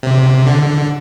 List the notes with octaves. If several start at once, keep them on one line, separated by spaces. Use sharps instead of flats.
C3
D3